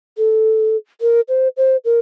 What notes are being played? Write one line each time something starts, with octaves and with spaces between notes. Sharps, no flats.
A4
A#4
C5
C5
A#4